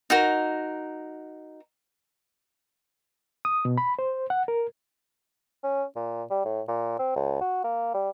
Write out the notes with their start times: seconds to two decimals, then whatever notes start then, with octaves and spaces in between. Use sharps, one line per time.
0.10 D#4 F#4 A#4
3.45 D#6
3.65 B2
3.78 B5
3.99 C5
4.30 F#5
4.48 A#4
5.63 C#4
5.96 A#2
6.30 G3
6.45 A2
6.68 A#2
6.99 C4
7.16 C#2
7.41 F#4
7.64 A#3
7.94 G3